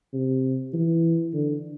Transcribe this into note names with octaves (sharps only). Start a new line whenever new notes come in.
C3
E3
D3